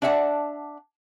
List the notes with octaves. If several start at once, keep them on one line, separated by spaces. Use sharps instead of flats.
D4 D5 E5 F#5 G#5 A5